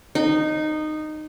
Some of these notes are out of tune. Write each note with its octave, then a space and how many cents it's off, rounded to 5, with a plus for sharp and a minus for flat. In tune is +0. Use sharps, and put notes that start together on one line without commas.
D#4 -15